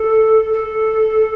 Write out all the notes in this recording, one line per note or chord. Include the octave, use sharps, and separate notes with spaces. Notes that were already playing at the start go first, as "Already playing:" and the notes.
Already playing: A4
A4